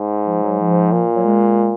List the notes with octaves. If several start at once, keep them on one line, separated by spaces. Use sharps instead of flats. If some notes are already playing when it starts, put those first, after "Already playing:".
Already playing: G#2
F3
F#3
F3
A#2
F#3
G#3